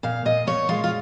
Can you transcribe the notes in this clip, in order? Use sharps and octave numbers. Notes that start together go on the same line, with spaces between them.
A#2 F5
A#2 D#5
A#2 C#5
G#3 F4
F4